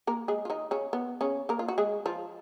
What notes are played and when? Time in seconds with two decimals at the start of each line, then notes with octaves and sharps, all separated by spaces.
0.07 A#3 A#4
0.28 G#3 G#4
0.45 F4
0.50 D#3 D#4
0.71 C#3 C#4
0.93 B3
1.21 C#3 C#4
1.49 A#3 A#4
1.59 F4
1.68 F#4
1.78 G#3 G#4
2.06 F3 F4